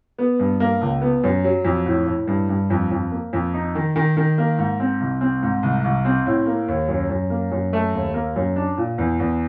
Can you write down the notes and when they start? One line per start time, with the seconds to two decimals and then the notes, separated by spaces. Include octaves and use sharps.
0.18 B3
0.39 G2
0.60 A#3
0.81 C#2
1.02 B3
1.24 F#2
1.44 F#3
1.64 F2
1.86 A2
2.07 A2
2.27 G2
2.49 G2
2.70 F2
2.91 F2
3.11 A#3
3.33 F2
3.54 D#4
3.75 D#3
3.96 D#3
4.17 D#3
4.38 A#3
4.58 G#2
4.80 C4
5.00 C2
5.21 C4
5.42 G#2
5.63 C2
5.84 C2
6.05 C4
6.26 A2
6.46 A#3
6.68 D#2
6.89 F#2
7.09 F#2
7.30 A#3
7.52 F#2
7.73 A3
7.94 D#2
8.14 A#3
8.36 F#2
8.56 D4
8.77 A#2
8.98 E2
9.20 E2